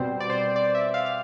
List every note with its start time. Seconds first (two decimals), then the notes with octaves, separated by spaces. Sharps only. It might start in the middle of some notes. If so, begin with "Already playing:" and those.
Already playing: B2 G3 C4 C5
0.20 D5
0.30 C5
0.56 D5
0.75 E5
0.94 F5
1.06 F5